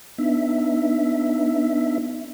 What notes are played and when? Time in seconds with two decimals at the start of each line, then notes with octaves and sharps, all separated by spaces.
0.18 B3 D4 D#4 E5